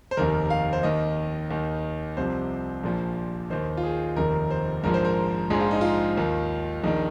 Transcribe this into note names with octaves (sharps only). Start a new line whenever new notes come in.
C5
F1 D#2 D#3 A#4
F5
C5
D#2 D#3 D#5
D#2 D#3
C2 C3 F3 C5
A#1 A#2 F3
D#2 D#3 C5
F4
G#4
F1 D#2 D#3 A#4
C5
A#1 G#2 F3 A#4
C5
A#4
A#1 G#2 F3 G#4
F4
D#4
F4
D#2 D#3
A#1 D#3 D#4